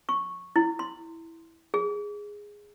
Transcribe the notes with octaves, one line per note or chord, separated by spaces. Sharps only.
C#6
E4
C6
G#4